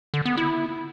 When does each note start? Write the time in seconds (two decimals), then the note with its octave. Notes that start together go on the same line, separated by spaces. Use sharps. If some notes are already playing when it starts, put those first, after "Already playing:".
0.14 D3
0.26 B3
0.37 E4